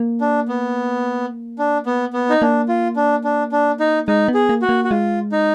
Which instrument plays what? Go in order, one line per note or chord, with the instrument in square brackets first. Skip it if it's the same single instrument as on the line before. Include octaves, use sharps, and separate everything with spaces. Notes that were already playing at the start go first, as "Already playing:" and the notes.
Already playing: [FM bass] A#3
[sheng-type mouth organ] D4
B3
D4
B3
B3
D#4
[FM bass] A#3 [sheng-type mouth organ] D4
[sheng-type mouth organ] F4
D4
D4
D4
D#4
[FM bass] G#3 [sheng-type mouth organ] D#4
[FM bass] B3
[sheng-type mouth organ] G#4
[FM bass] A#3
[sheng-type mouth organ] F#4
[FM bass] A#3
[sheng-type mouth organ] F#4
[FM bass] G#3 [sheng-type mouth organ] F4
[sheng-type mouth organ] D#4